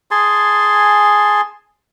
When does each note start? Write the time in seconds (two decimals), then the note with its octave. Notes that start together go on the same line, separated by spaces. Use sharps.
0.11 G#4 G#5 A5 C6